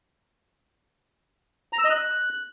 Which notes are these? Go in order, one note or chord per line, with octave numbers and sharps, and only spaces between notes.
A#5
E6
D#5
F#6